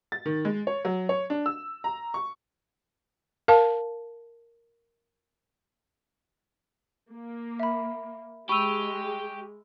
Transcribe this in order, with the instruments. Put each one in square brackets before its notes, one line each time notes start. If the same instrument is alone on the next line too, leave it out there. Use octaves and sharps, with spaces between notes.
[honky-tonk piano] A6
D#3
G#3
C#5
F#3
C#5
D4
E6
A#5
C#6
[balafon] A#4 F5 A5
[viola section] A#3
[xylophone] E5 B5
[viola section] G#3 [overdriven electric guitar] G4 [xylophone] B5 E6 [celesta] C#6 D#7 F7